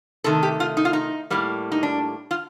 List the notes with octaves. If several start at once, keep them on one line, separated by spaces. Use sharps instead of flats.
C3 D#3 A3 A4
G4
F4
D#4
F4
D#4
A2 G3 A#3
D#4
D4
F4